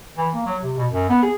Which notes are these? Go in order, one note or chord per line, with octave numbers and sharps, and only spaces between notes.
E3
A#3
F#3
C3
B2
F#2
B3
G#4